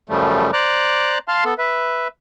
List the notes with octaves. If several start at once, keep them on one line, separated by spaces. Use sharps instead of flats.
F#2 C#3 F3 G3 A3
C5 D5 A#5 D6 F#6
F5 A5 C6 F6
B3 A4
B4 E5